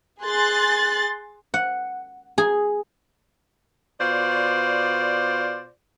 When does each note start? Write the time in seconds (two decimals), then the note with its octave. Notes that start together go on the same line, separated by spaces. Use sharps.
0.22 G#4 C6 F#6 A6
1.54 F#5
2.38 G#4
4.00 B2 F4 C5 D5